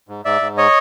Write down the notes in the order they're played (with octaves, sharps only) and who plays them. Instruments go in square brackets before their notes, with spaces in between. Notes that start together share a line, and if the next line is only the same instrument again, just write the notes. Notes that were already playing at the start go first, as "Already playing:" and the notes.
[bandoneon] G#2
G#2 D5 E5
G#2
C#5 D#5